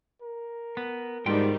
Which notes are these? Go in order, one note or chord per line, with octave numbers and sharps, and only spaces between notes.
A#4
B3
G#2 D#3 G3 B3 D4 F4 G5